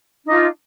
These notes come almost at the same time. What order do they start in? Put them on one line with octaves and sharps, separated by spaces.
D4 D#4 F4